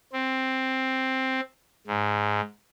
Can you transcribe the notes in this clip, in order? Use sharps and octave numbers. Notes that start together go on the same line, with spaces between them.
C4
G#2